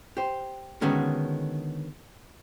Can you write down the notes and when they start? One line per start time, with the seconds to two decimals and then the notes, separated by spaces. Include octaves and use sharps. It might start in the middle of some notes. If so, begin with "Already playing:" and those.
0.17 G4 C5
0.81 D3 D#3 G#3 B3 C#4 F#4